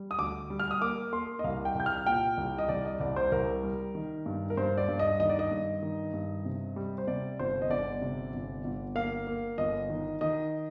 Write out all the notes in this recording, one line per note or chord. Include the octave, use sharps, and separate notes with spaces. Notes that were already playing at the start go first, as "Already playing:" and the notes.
Already playing: G3
D#6
D2 D6
G3
F6
D#6
A#3 D6
A#3 C6
D#5
C2 F5
G5
C2 G6
F6
A#2 G5
C2
D#5
C2 D5
D#5
C2 D5
C5
C2 A#4
G3
D#3
G2
A#4
G2 C5
D5
G2
D#5
D#3 D#5
D5
D#5
G2
D#3
G2
C3
G3
C5
C3 D5
G1 C5
D#5
G1 D5
C3
G1
G1
A#3 F5
A#3
G1 D#5
D#3
D#3 D#5